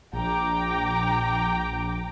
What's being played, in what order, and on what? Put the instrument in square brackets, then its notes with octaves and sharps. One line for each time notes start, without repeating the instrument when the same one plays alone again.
[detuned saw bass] A#1 [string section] G5 A#5 D6